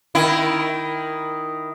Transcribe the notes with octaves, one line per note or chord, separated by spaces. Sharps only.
D#3 E4